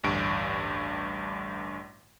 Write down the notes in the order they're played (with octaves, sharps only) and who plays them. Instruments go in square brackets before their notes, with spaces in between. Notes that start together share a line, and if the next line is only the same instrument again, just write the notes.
[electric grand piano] A1 D2 G2 D7